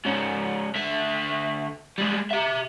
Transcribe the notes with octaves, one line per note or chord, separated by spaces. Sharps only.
G#2 C#4
D3 E5
G3 G#3
G4 E5